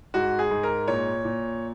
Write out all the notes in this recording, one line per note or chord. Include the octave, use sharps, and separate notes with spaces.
G#2 F#4
G#4
G#2
A#4
A#2 C#5
A#2